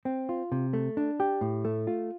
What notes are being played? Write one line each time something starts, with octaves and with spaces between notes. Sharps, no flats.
C4
F4
C3
A3
D4
G4
A2
A3
F4